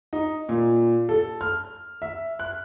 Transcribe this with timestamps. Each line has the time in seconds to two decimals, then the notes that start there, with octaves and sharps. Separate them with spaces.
0.13 D#4
0.49 A#2
1.09 A4
1.41 F6
2.02 E5
2.39 F#6